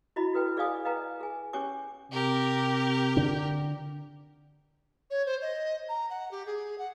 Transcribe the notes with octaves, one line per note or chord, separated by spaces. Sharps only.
E4 F#4 D#5 B5
F#4 A4 B4 G5
G#4 D5 D#5 F5 G#5 D#6
B4 D#5 F5 G5 A#5
G#4 G#5
C#4 G4 C#5 G#5 D6
C3 G4 A#4
D3 D4
C#5
C5
D#5
A#5
F#5
G4
G#4
F#5